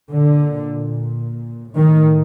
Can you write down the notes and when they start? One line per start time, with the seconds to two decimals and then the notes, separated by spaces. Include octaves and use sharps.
0.12 A#2 D3
1.76 A2 D#3